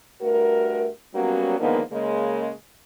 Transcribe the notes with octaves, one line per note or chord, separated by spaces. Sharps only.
G2 A3 F#4 A#4
F#3 G3 A#3 B3 C#4 F#4
D3 D#3 F3 G#3 A#3 B3
C#3 G#3 A#3